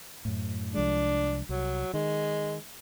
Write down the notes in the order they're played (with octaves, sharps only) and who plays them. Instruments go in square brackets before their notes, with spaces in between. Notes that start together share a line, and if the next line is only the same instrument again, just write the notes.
[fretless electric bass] F#2 A2
[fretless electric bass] C2 F3 G#3 [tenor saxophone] D4
[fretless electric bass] C2 [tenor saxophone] F#3
[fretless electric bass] D#3 [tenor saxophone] G#3